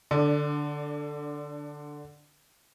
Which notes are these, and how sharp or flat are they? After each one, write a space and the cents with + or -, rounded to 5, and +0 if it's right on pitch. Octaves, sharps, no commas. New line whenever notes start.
D3 +10 D4 -15